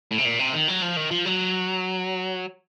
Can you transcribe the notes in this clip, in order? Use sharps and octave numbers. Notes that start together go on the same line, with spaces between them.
A2
C3
A#2
C3
D#3
F#3
F3
D#3
F3
F#3